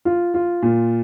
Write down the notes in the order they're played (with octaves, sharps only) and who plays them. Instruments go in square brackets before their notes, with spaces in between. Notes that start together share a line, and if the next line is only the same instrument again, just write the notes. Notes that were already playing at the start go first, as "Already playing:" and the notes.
[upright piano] F4
F4
A#2